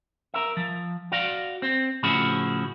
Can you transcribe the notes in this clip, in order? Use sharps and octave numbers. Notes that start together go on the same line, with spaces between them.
A#4 E5
F3
F#4 D5 F5
C4
A2 C#3 F3 E4 F#4 G#4